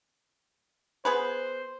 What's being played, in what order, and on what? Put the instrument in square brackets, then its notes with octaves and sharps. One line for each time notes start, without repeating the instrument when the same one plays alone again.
[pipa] B3 G#4 B4 [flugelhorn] C5